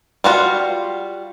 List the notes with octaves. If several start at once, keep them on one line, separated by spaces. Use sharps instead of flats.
G3 F4 F#4